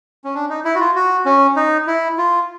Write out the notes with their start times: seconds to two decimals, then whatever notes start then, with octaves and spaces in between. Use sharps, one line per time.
0.24 C#4
0.35 D4
0.50 D#4
0.65 E4
0.75 F#4
0.80 F4
0.95 F#4
1.26 C#4
1.56 D#4
1.87 E4
2.18 F4